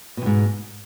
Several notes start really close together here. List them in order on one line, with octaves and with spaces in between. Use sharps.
B2 F2 G#2